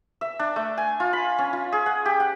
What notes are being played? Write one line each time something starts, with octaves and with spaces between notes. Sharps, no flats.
E5
D4
A3
G#5
F4
B5
C#4
F4
G#4
F#5
G4
F#5